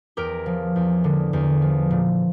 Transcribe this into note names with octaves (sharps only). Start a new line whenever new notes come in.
E2 G4 A#4
F3
E2
D3
E2
F3
A#2